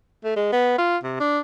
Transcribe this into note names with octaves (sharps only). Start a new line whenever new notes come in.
A3
G#3
B3
F4
C3
D4